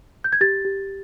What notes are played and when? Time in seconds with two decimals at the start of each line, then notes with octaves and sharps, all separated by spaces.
0.24 G6
0.32 G#6
0.41 G4 A6
0.65 G4